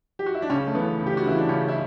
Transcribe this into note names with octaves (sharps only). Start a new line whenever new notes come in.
G4
F#4
E4
D4
C#2 C#3 C#4
A3
C#3 E3 B3
C#2
G4
F#4
C#3 E3 E4
D4
C#2 C#3 C#4
E4